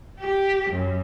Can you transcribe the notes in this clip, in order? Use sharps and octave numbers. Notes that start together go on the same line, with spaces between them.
G4
F#2